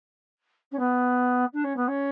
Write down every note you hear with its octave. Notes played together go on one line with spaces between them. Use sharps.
C#4
B3
D4
C#4
B3
C#4